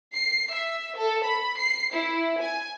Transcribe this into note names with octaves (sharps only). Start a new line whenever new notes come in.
C7
E5
A4
B5
C7
E4
G#5